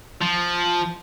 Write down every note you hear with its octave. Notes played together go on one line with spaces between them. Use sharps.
F3